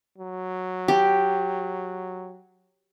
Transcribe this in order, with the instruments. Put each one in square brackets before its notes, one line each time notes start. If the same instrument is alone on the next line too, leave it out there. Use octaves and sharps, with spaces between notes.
[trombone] F#3
[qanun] G4